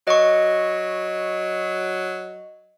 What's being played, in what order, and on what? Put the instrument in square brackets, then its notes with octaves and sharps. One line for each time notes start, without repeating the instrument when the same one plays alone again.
[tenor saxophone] F#3 [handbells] D#5 C#6